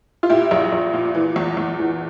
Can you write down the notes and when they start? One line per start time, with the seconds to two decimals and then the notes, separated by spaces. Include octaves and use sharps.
0.23 F4
0.29 A#2 E4 G4
0.51 A#1
0.72 A#1
0.93 A#2
1.15 E3
1.36 E2
1.57 E2
1.78 E3